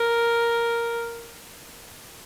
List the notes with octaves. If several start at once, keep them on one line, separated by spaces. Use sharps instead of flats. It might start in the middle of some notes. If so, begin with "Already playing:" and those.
Already playing: A#4